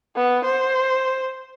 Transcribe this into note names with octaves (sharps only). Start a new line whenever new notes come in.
B3
C5